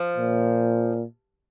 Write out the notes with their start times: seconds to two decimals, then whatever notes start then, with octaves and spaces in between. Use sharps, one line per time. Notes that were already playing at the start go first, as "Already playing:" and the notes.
Already playing: F3
0.17 A#2